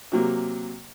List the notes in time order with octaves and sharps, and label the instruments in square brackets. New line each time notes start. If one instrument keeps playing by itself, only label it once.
[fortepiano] C3 F#3 A#3